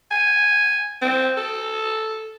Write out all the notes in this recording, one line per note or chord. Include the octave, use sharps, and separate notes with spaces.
G#5
C4
A4